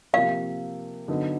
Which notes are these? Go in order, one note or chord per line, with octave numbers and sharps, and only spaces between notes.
C3 F3 A#3 F5
D3 F#3 B3 D#4